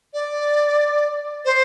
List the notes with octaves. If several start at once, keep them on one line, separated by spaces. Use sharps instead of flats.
D5
C5